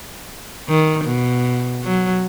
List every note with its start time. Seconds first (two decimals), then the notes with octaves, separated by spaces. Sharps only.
0.69 D#3
1.06 B2
1.84 F#3